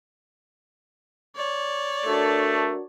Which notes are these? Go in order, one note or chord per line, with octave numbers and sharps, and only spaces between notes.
C#5 D5
A3 D4 F#4 A4 A#4